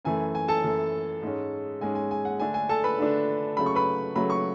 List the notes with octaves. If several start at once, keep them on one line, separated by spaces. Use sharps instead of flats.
F#2 E3 A3 G#5
G#5
A4 A5
F#2 E3 A3
G#2 G#3 C#4
G#2 G#3 C#4 G#5
G#5
G#5
F#5
D3 A3 D4 G#5
G#5
A4 A5
B4 B5
D3 A3 D4
C#3 F#3 A3 B5
C#6
B4 B5
C#3 F#3 A3 B5
C#6